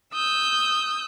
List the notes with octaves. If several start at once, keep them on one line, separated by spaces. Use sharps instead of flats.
D#6 E6 G6